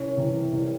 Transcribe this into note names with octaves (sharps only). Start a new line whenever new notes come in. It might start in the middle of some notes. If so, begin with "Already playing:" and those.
Already playing: C2 C#4 C#5
C3 E3
C2